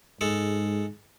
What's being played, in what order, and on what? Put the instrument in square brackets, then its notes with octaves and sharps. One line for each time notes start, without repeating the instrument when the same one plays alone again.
[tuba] G#2 [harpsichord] G#3 A4